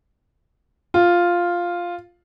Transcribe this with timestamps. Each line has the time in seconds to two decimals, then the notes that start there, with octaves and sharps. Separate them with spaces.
0.94 F4